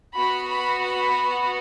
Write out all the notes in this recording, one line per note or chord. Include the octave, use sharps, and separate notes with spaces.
B3 F#4 B5
B5
B5